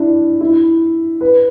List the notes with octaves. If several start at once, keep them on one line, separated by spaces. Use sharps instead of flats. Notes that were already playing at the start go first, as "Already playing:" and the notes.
Already playing: D4 E4
E4
B4